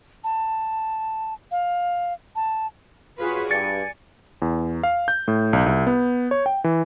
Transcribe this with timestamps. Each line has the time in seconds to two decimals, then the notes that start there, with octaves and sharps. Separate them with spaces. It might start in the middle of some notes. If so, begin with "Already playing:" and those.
0.24 A5
1.52 F5
2.36 A5
3.19 F4 F#4 G#4 B4 C#5
3.51 G2 D5 G#5 A6 C#7
4.42 E2
4.83 F5
5.08 G6
5.28 A2
5.53 B1
5.66 C2
5.87 B3
6.31 C#5
6.46 G5
6.64 E3